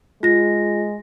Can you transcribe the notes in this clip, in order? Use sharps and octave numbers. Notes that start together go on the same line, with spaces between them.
G#3 F4 A#6